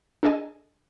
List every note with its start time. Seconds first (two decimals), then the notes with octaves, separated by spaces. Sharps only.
0.23 D4 G#4 A4 D#5 G#5